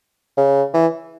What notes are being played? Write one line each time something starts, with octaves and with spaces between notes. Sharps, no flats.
C#3
E3